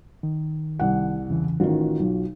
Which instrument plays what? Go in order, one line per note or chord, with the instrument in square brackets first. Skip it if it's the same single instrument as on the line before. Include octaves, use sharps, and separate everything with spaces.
[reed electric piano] D#3
[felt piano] C2 F#5
[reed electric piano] E2 C#3 E3
[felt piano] A1 D#3 [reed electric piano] F4 F#4
[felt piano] B1